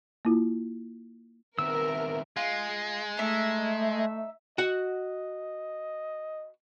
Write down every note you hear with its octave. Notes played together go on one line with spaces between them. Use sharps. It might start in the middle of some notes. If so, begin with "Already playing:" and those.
A#3 E4 F4
D#3 B3 C4 A#4 E5 E6
G#3 F4
A3 D#4 E5
F#4 D#5 F#5